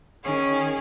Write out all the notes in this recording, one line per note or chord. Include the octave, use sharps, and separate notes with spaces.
D#3 C#4 G#4